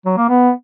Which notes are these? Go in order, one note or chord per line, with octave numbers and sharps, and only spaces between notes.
F#3
A#3
B3